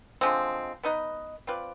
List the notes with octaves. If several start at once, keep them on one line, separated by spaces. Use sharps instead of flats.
D3 F3 G#3 C4
B3 D#4 B4 D#5
C4 F4 B4 D5